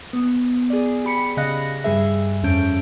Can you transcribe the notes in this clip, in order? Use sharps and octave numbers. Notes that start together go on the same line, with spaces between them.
B3
G#4 D5
G4 B5 C#7
C#3 D#5 F5 F#6 A#6
G2 G3 G#4 E5
F2 C#3 C#4 A4 G6 D7